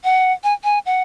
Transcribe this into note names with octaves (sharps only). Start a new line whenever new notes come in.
F#5
G#5
G#5
F#5